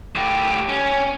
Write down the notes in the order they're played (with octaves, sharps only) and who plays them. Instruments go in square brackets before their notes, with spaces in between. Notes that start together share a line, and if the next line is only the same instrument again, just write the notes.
[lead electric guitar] A2 G4
C#4